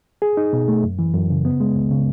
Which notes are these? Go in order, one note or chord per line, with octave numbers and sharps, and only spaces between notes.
G#4
D#4
B2
A3
F#2
E3
F#2
C#3
B3
G#3
C#2
C#3